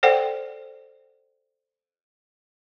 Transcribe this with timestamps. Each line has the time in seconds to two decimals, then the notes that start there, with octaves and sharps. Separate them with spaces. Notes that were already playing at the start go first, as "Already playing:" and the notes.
0.03 A4 C5 D5 F#5 G5